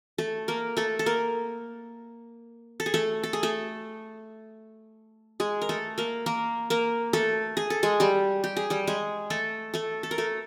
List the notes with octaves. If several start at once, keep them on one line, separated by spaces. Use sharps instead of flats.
A3 A4
A#3 A#4
A3 A4
A4
A#3 A#4
A4
G#4
A3 A4
A4
G#4
A3 A4
G#3 G#4
A#4
A3 A4
A#3 A#4
A#3 A#4
A#3 A#4
A3 A4
G#4
A4
G#3 G#4
G3 G4
G4
G#4
G3 G4
G#3 G#4
A3 A4
A3 A4
A4
A#4
A3 A4